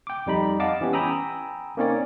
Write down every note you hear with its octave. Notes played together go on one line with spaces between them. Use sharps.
G5 D6
F2 G3 D#4 B5
D#5 F5 F#5 A5 D6
E3 B3 C#4 G4
G5 G#5 A#5 B5 D#6 E6
A#3 C4 C#4 D#4 C#5 D5